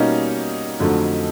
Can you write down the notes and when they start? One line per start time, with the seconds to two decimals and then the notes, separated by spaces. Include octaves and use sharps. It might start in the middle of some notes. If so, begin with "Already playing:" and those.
Already playing: B2 G3 A#3 C#4 D#4
0.80 F2 D3 F#3 A3